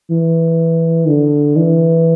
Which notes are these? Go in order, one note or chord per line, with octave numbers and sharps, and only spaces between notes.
E3
D3
E3